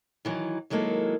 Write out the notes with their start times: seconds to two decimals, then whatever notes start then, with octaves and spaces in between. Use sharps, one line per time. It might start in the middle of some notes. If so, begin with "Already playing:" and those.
0.25 D#3 E3 F#3
0.70 D#3 F#3 G#3 A#3 E4 A4